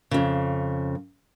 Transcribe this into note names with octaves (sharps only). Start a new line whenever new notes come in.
F2 C#3